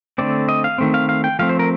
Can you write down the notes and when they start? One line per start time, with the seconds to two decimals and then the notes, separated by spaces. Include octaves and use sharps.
0.18 D3 A3 C4 D5
0.49 D#5
0.64 F5
0.78 D#3 A3 C4
0.94 F5
1.09 F5
1.24 G5
1.39 F3 A3 C4 F5
1.49 C5
1.59 A#4